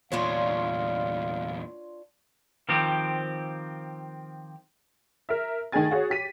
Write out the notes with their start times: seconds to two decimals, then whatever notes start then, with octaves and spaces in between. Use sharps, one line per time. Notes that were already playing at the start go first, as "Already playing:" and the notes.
0.12 E2 A#2 D4 F4 C#5 F5
2.69 D#3 F3 C4 G4
5.29 A#4 E5
5.72 D#3 A3 G#4 G#5 A6
5.91 F#4 G#4 C#5
6.10 G4 B6 D#7